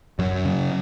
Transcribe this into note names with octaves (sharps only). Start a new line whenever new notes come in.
F#2 F#3
C#3